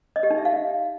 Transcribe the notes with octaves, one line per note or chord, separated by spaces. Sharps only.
D#5
G4
D#4
E5
F5